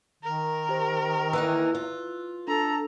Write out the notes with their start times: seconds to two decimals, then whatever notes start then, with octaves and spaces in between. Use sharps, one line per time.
0.23 D#3 A#4
0.69 G4 C5
1.33 E3 A#3 D#4 E6 F#6
1.75 F4
2.48 D4 A4 A#5